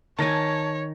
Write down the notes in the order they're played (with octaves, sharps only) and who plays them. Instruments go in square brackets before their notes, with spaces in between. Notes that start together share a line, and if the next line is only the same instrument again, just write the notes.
[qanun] D#3 G#5 [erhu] C#5 [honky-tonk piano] A5 A#6